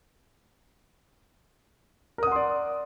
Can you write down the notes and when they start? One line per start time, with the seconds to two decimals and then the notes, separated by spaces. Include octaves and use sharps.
2.18 A#4
2.23 D#6
2.27 F#5
2.32 C6
2.36 D5